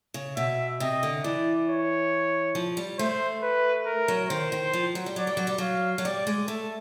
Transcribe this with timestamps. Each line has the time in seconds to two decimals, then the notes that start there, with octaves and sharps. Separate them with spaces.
0.14 C#3
0.36 B2 E5
0.80 C3 D#5
1.03 D3
1.24 E3 D5
1.68 C#5
2.55 F3
2.77 G3
2.98 A3 C5
3.42 B4
3.86 A#4
4.08 F#3
4.29 D#3 C5
4.52 D#3
4.74 F3
4.95 F#3
5.06 G3
5.16 F#3 D5
5.27 G3
5.37 F#3
5.47 G3
5.58 F#3 F5
5.98 F#3
6.05 G3 D5
6.27 G#3
6.48 A3 A4